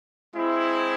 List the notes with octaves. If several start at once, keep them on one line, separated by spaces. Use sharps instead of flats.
G#3 C4 E4